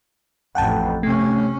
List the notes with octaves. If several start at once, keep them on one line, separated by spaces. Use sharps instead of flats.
A1 F2 F#5 G5 A5
C3 A3 C#4